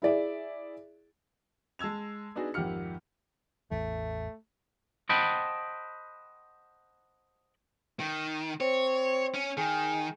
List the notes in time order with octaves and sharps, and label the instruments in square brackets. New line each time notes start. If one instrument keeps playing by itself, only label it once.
[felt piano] E4 G#4 D5 E5
[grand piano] G#3 A5 E6 G#6 F7
B3 D4 D#4 F#4 G#4
G#1 F2 G4 F#5 F6 C#7
[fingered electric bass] A1 E2 [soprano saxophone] A3
[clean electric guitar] C5 D#5 F#5 G5 A5 B5
[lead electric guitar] D#3
[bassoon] C4 [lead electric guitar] C#5
[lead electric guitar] C#4
[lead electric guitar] D#3 [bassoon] G#4